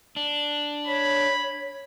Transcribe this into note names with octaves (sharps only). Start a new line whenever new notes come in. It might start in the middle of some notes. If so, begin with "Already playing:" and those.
D4
C#5 B5